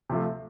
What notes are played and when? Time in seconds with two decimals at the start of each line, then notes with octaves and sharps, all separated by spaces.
0.09 C3 F3 A3